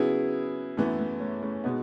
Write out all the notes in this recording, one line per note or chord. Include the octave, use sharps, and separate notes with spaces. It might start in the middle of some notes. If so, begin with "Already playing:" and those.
Already playing: C#3 F#3 B3 E4 G#4
F#2 E3 A3 B3
A3
A3 C#4
A3 C#4
B2 G#3 B3 D#4